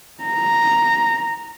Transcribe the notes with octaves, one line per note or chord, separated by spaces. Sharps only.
A#5